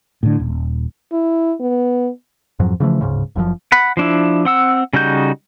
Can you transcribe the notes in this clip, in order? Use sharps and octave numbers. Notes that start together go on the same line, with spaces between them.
A2 D3
D#1
E4
B3
F2 G#2 F3 F#3
C#3 E3 F3 A3
D1 G#2 C#3
F#1 F#2 A2 F3
F#5 B5
F3 D4 E4
C4 F#5 E6
C#3 G3 D#4 F#4 G6